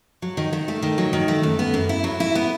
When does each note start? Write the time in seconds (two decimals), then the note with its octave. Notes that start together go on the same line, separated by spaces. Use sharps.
0.22 F#3
0.37 D#3
0.53 D#3
0.68 A3
0.83 D#3
0.98 F#3
1.13 D#3
1.28 A3
1.43 F#2
1.59 B3
1.74 F#2
1.89 E4
2.04 F#3
2.20 E4
2.35 B3